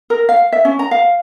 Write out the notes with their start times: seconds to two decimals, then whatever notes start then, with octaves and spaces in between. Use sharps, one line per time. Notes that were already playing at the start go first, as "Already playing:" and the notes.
0.10 A#4
0.29 F5
0.52 E5
0.65 C#4
0.79 A#5
0.91 F5